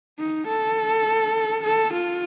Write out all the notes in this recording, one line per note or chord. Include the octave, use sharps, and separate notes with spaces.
D#4
A4
A4
F4